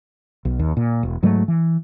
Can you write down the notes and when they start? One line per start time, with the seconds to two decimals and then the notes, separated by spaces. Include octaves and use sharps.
0.45 B1
0.59 D#2
0.77 A#2
1.03 E1
1.23 G#2 F#3 G#3 A3
1.48 E3